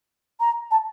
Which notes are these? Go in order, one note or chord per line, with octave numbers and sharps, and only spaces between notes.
A#5
A5